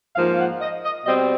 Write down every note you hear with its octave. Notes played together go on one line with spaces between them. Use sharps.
G#2 F3 A#3 F5
F#5
D#5
D#5
B2 G3 C4 D#5